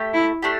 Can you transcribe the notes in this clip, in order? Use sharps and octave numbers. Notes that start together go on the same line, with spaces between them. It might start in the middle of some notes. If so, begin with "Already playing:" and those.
Already playing: A3 G4
E4
A3 D4 G4